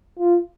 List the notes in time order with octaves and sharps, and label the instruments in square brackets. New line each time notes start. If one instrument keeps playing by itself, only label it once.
[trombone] F4